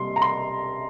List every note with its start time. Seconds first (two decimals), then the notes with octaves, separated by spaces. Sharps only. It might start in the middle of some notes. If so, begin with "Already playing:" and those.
Already playing: C3 G3 A#3 C6
0.16 A#5
0.22 C6